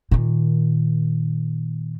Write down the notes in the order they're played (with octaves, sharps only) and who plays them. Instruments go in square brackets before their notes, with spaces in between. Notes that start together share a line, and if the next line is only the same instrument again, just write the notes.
[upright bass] A#2 D#3